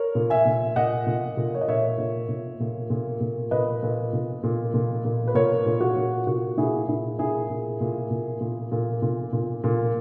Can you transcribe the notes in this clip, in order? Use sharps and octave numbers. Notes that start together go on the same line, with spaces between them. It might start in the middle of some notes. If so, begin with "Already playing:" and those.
Already playing: A#4 C#5
A#2
E5 G#5
A#2
A#2 D#5 F#5
A#2
A#2
C#5
D#5
A#2 C#5 E5
A#2
A#2
A#2
A#2
A#2
A#2 B4 D#5
A#2
A#2
A#2
A#2
A#2
B4
A#2 A#4 C#5
A#2
F#4
A#2
A#2 F#4
A#2 E4 G#4
A#2 E4
A#2 E4 G#4
A#2
A#2
A#2
A#2
A#2
A#2
A#2
A#2